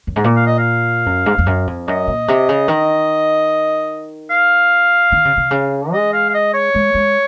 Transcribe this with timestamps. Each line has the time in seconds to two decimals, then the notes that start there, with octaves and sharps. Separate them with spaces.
0.07 F#2
0.16 G#2
0.24 A#2
0.36 F5
0.47 D#5
0.58 F5
1.06 F#2
1.26 G#2
1.38 F2
1.46 F#2
1.67 F2
1.88 F#2 D#5
2.07 A#2
2.28 C3
2.49 C#3
2.68 D#3
4.30 F5
5.12 D#3
5.25 C#3
5.37 C3
5.51 C#3
5.93 G#3 D#5
6.13 F5
6.29 F5
6.34 D#5
6.54 C#5
6.74 G#3
6.95 G#3